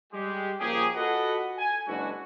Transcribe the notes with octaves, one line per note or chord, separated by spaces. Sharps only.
G3 G#3 G4
A#2 F3 A#3 C#4 G4 G#4
F4 F#4 A4 B4 D#5 F#5
G#5
F#1 G#3 D4 E4 F#4